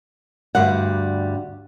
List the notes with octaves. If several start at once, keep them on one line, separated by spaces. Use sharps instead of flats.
D2 G2 G3 F#5